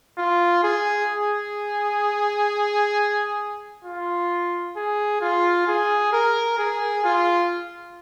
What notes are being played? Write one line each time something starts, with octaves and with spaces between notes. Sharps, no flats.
F4
G#4
G#4
F4
G#4
F4
G#4
A#4
G#4
F4